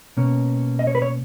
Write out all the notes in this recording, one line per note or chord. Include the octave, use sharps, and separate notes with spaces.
B2 A#3 C#4
D#5
C#5
B4
C#5